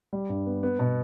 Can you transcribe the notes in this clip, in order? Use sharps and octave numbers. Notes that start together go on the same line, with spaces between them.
G3
G2
B3
B3
B2